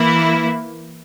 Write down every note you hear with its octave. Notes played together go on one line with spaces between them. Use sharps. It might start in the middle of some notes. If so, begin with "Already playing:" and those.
Already playing: E3 A#3 E4